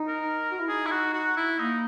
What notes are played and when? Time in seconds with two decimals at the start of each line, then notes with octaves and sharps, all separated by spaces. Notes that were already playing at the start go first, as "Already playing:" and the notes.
Already playing: D#4
0.08 A#4
0.51 F#4
0.60 E4
0.68 D#4 G#4
0.86 E4
0.91 F#4
1.14 F#4
1.37 E4
1.59 A#3 D#4